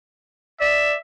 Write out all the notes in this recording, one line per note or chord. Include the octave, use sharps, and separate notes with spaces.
D5 E5